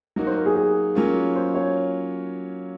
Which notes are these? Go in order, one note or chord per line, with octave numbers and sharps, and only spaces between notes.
F#3 A#3 D#4 F#4
C5
A#4
G#4
G#4
F#3 A#3 C#4 F4
C5
C#5